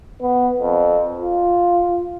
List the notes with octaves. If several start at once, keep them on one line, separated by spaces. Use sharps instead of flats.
B3
F2
F4